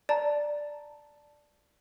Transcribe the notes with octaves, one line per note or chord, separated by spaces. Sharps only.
D5 A5 A#5